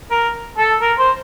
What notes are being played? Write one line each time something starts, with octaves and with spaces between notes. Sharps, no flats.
A#4
A4
A#4
C5